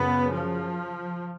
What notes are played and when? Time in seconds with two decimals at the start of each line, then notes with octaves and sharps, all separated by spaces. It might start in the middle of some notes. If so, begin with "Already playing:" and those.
Already playing: F#2 C#3 B3
0.29 F3